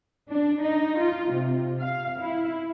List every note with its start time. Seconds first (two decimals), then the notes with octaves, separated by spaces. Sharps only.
0.29 D4
0.62 D#4
0.99 F4
1.32 C3
1.80 F5
2.21 E4